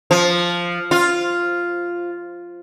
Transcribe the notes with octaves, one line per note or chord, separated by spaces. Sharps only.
F3
F4